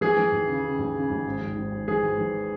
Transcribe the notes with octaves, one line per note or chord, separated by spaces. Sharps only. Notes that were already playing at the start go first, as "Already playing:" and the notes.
E3 G#4
E3
D#2
C#3
C#3
D#2
C#3
D#2
G#1
G#1
G#1
G#1
E3 G#4
G#1
E3